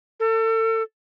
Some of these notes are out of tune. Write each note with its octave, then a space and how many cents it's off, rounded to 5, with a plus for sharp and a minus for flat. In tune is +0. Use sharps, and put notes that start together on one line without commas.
A4 +35